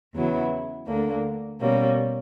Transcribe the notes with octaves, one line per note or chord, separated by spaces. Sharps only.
E2 C#3 F#3 B3 E4
D2 D3 A#3 D4
B2 G3 A#3 C#4